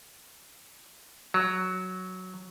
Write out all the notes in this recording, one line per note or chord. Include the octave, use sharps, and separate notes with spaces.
F#3